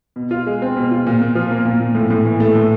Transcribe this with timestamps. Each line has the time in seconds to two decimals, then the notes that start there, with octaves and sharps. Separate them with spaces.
0.16 B2
0.31 F4
0.47 G#3
0.62 C4
0.77 B2
0.91 F4
1.07 A#2
1.21 A#2
1.35 F3
1.51 A#3
1.65 A#2
1.80 A#2
1.95 A2
2.10 A2
2.25 E3
2.40 A3
2.55 A2